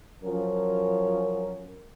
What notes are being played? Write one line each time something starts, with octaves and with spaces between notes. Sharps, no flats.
F3 F#3 C#4 A#4